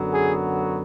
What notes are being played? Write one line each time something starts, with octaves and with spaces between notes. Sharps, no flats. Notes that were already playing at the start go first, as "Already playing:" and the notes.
Already playing: F#2 D3 F#3 B3
G#4